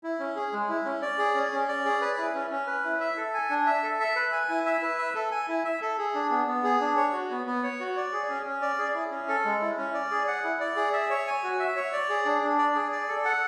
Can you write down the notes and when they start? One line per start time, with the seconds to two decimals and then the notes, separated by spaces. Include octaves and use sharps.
0.03 E4
0.20 C#4
0.36 G#4
0.52 G#3
0.69 E4
0.85 C#4
1.02 D5
1.18 G#4
1.35 C#4
1.52 C#4
1.68 D5
1.85 G#4
2.01 B4
2.18 E4
2.35 C#4
2.51 C#4
2.67 B4
2.84 E4
3.00 E5
3.17 A4
3.34 G#5
3.50 D4
3.66 E5
3.83 A4
4.00 E5
4.16 B4
4.32 G#5
4.49 E4
4.65 E5
4.82 B4
4.98 E5
5.15 A4
5.31 G#5
5.48 E4
5.65 E5
5.82 A4
5.98 G#4
6.14 D4
6.31 B3
6.47 B3
6.64 G#4
6.81 D4
6.96 C#5
7.13 F#4
7.31 B3
7.46 B3
7.63 C#5
7.80 F#4
7.96 D5
8.13 G#4
8.29 C#4
8.46 C#4
8.62 D5
8.78 G#4
8.95 E4
9.11 C#4
9.28 A4
9.45 G#3
9.61 E4
9.78 C#4
9.94 D5
10.11 G#4
10.28 F#5
10.44 E4
10.60 D5
10.76 G#4
10.93 E5
11.10 C#5
11.27 G#5
11.44 F#4
11.59 E5
11.76 C#5
11.93 D5
12.09 G#4
12.25 D4
12.42 D4
12.58 D5
12.75 G#4
12.92 D5
13.08 A4
13.25 F#5